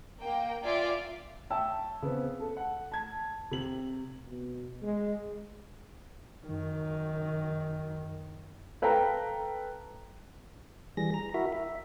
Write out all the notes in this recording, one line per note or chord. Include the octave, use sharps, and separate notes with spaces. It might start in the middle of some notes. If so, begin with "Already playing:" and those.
A#3 G5
F4 D5 E5 F5 G#5 D6
C#5 E5 G5 A5 E6
C#3 B3 C4
A4
F#5
A5 G#6
C3 F#7
B2
G#3
F#2 D#3
A4 B4 F5 G5 A#5
E3 G3 G#4 A#6
A#5
E4 F#4 A#4 E5
E5